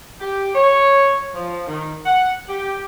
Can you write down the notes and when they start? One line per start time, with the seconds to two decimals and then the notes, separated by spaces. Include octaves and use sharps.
0.21 G4
0.55 C#5
1.35 F3
1.68 D#3
2.06 F#5
2.49 G4